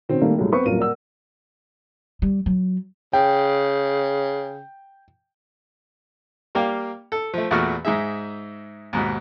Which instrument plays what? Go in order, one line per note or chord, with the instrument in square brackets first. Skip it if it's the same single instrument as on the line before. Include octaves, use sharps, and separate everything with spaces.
[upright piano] B2 D#3 C4 C#4
D#3 G3 A3 A#3
C2 G#2 F3 F#3 G#3 A3
B3 C4 B4 C#6
D#1 A1 F#2 F4 A#4 D#7
A#4 D5 F#5 E6
[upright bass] G3
F#3
[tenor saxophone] C#3 [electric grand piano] G5
[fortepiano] G3 A#3 D5 F5 G5
A4
F3 A3
E2 A#2 A3 F#4 C#6 F6
G#2 D#4 G#4 E5
D#2 G#2 B2